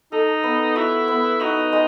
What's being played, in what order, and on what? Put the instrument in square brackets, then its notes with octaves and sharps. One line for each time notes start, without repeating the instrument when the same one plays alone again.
[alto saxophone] D#4 [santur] A4
[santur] B3
[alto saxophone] E4 [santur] F#4
[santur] B3
[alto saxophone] D#4 [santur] F#4
[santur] G#3